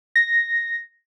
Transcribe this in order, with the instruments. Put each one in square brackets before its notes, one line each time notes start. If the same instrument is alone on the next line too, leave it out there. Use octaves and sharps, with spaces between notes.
[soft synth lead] A#6